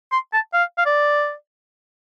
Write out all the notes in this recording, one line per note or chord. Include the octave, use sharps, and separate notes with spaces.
C6
A5
F5
F5
D5